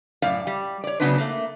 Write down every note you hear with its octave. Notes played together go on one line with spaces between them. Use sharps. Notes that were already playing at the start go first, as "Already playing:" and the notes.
F#2 A2 D5 F5
G3
C#5 D5
C#3 F#3 B3 D4 D#4 B4
A3 A#3